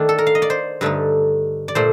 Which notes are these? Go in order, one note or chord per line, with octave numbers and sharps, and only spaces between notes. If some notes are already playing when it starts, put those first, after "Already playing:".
Already playing: D#3 A3 D4
A4
A#4
F5
D#5
D5
C5
G2 D3 A3 D#4
D5
A#2 A3 C5